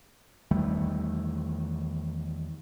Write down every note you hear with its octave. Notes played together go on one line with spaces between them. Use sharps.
E2 D#3 G3 A3